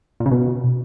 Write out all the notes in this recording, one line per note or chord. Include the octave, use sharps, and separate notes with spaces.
A#2
C#3
B2